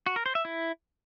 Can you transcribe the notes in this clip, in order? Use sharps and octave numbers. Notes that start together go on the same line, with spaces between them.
F#4
A#4
C5
E5
E4